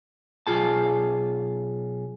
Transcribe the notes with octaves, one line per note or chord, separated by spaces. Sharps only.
B1 F4 G#4 A5